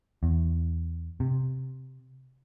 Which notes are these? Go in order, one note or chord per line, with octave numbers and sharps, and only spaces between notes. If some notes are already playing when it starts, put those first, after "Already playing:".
E2
C3